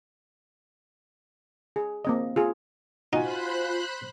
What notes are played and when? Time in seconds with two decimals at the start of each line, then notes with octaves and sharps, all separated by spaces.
1.76 G#4
2.05 A#3 C4 D#5
2.36 F4 G#4
3.13 D#4 F4 F#4 C5 G#5 B5 F#6